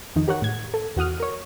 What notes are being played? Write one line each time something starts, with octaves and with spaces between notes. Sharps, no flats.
F2 D#3 D#4
G4 A#4 C#5 F#5
A2 G#6
A4
E2 F#4 F#5 D#6 F6
A#4 C#5